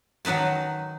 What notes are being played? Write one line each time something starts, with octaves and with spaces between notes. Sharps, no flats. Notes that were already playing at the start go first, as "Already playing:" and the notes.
D#3 F#3 D#4 B4 A5